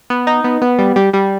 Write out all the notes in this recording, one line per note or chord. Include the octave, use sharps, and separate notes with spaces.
B3
D#4
B3
B3
G3
G3
G3